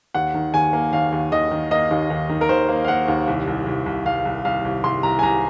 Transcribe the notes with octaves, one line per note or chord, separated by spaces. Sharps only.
D#2 F#5
D#3
D#2 G#5
A#3
D#2 F5
D#2
D#2 D#5
D#3
A#3 D#5
D#2
D#2
D#3
A#4
D#2 C5
A#3
F5
A#3 F#5
D#2
C2
C2
C2
C2
C2 F5
C2
C2 F5
C2
C2 C6
C2 A#5
G#5
C2 A#5